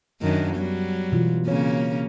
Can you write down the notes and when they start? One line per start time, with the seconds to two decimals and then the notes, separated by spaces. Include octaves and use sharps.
0.21 F#2 D#3 D4
0.56 F#3 G3 B3
1.12 B2 E3 F4
1.47 C#3 A#3 C4 C#4 C#5